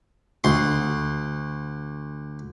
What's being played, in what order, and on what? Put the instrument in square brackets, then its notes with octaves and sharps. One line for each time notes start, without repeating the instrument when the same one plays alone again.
[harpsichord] D2 C6